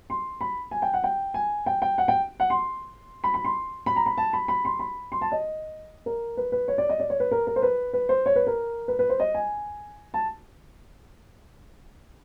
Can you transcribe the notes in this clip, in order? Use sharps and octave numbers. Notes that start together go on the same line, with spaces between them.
C6
B5
G#5
G5
F#5
G5
G#5
G5
G5
F#5
G5
F#5
C6
B5
B5
C6
B5
A#5
B5
A5
B5
B5
C6
B5
C6
A5
D#5
A#4
B4
B4
C#5
D5
D#5
D5
C#5
B4
A#4
A#4
C5
B4
B4
C5
C#5
B4
A#4
B4
B4
C5
D#5
G#5
A5